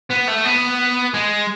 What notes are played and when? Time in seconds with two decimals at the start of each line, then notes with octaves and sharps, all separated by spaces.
0.10 B3
0.27 A3
0.45 B3
1.14 G#3